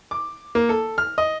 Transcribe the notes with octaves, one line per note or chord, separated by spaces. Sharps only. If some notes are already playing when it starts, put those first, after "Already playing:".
D6
A#3
A4
F6
D#5